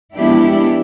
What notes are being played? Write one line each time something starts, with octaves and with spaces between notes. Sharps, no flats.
F3 G#3 B3 D4 E4 G4